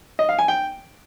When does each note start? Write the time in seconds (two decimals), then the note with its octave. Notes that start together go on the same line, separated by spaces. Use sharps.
0.19 D#5
0.29 F5
0.39 G#5
0.48 G5